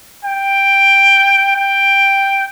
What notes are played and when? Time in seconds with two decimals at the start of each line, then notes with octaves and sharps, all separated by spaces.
0.25 G5
1.56 G5